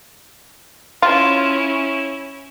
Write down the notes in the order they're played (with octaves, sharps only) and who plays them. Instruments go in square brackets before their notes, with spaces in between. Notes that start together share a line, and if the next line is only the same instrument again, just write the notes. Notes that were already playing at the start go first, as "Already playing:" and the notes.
[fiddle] C#4 E4 [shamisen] F4